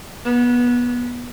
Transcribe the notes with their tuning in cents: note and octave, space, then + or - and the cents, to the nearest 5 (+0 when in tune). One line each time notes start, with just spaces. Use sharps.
B3 -20